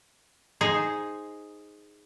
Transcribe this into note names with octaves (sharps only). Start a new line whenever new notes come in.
D#4 G#4 C5